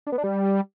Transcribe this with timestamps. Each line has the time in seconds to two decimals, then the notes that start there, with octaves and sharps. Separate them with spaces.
0.07 D4
0.12 B3
0.18 D4
0.24 G3